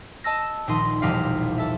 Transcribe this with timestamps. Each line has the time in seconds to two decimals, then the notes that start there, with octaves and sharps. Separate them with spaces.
0.24 D#5 A5 E6 A#6
0.67 D#1 A#1 D#4 D#5 C6
1.02 E1 A#1 G3 D#4 G4 F5
1.58 A4 E5